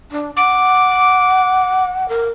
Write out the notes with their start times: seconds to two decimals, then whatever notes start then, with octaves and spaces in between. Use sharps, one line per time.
0.12 D4
0.36 F#5 D6
2.09 A#4